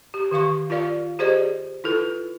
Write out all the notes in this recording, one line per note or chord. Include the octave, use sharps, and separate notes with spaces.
G4
D#3 G4 F5 C#6
F4 A#4 D5 F5
G4 G#4 C5 D5 D#5
E4 F4 A4 B4